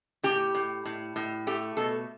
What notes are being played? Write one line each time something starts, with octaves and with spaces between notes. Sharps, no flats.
A2 G4
A2
A2
A2
A3 G4
B2 A4